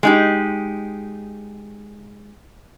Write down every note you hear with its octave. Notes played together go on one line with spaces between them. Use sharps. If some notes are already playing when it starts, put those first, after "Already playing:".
G#3 D#4 G4